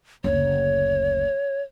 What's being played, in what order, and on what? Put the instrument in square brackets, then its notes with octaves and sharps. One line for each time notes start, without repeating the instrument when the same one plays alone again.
[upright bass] F#1 D2 [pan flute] C#5